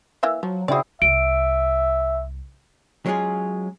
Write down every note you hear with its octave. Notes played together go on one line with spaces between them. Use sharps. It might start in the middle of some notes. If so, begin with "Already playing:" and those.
E3 A#3 E5
F3 F#3
C#3 C4 E4 F#4 G#4 D5
C2 E5 D7
F#3 G#3 C#4 F4 G#4